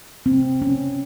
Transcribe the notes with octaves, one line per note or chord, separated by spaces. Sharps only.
C4
C#4